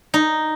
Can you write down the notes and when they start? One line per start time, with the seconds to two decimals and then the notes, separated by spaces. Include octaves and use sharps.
0.14 D#4